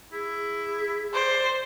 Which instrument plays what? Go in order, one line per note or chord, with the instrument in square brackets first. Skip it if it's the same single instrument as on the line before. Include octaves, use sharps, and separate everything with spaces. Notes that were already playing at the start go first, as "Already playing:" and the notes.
[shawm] E4 [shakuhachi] G#4
[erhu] C5 [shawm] D5